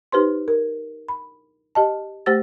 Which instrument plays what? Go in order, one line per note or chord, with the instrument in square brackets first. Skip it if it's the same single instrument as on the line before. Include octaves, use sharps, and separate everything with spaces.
[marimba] D#4 G4 B4 C5 C6
A#4
B5
G4 D#5 A5
A3 G4 C5 F#5 E6 A6